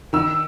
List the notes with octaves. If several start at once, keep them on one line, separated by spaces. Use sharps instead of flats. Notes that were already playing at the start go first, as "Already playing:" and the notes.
D#3 E6